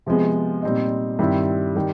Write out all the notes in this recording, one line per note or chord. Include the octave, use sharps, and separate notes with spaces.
C3 F3 G#3 B3
A#2 G3 C4 D#4
G2 D#3 G3 C4 E4
D#3 G3